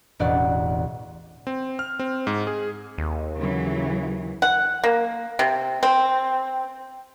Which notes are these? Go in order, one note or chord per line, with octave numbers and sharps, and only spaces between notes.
E1 A1 D5 F#5
C4
F6
C4
G#2
G#4
D#2
C#3 E3 F#3
F#5
A#3
C3
C4